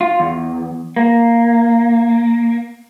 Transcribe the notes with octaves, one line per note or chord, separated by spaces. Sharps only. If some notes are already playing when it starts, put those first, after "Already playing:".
F4
E2
A#3